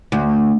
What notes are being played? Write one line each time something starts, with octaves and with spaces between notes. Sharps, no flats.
D2